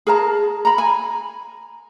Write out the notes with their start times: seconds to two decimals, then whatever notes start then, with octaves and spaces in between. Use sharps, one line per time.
0.07 G#4 A#4 A5 A#5
0.65 A#5 B5
0.78 G#5 B5